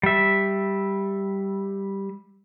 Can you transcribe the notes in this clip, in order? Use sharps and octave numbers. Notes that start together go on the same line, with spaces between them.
G3 E5